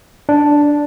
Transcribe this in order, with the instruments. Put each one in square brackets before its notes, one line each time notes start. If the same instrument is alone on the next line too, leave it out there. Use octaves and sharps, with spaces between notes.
[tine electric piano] D4